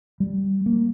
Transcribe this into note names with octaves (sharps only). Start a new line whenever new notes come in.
G3
A#3